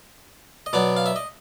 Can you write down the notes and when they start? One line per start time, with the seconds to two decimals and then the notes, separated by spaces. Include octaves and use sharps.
0.66 D#5
0.73 B2 F#3 B3 D5
0.97 F5
1.06 E5
1.16 D#5